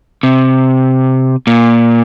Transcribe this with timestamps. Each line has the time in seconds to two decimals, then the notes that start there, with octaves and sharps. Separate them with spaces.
0.23 C3
1.47 A#2